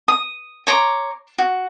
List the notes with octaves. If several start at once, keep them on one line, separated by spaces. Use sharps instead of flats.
D#6
C#5 A#5 C6 D6
F#4